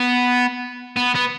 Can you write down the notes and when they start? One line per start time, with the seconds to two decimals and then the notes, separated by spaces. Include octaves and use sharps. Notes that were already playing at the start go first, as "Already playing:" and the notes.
Already playing: B3
0.97 B3
1.15 B3